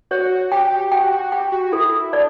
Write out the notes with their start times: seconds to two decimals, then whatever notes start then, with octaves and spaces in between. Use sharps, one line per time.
0.11 F#4 C#5
0.52 G4 G5
0.92 F#4 G5
1.11 F#4
1.32 G4 G5
1.52 F#4
1.72 E4 A4
2.13 D4 D5